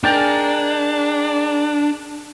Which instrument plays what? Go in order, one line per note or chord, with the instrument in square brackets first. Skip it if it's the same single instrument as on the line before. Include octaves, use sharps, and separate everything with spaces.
[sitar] G#3 A#4 [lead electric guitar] D4 [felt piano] G5 G6 A6